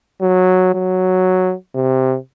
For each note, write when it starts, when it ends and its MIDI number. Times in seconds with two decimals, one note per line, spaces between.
0.22 0.71 54
0.75 1.53 54
1.75 2.16 48